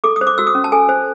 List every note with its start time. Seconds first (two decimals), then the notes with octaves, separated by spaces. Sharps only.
0.04 A4 D6
0.16 D#6
0.21 C5
0.27 D6
0.38 F#4 E6
0.47 D#6
0.55 C#4
0.64 A5
0.72 A4 G#5
0.89 C5